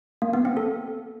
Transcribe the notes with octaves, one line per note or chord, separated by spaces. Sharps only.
A#3
B3
C4
A4